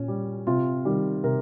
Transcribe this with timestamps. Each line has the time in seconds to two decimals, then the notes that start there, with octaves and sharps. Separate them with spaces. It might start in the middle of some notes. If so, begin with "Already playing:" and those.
Already playing: A#2 C#4
0.08 G3
0.47 C3 F4
0.85 D#3 G3
1.24 C3 A#4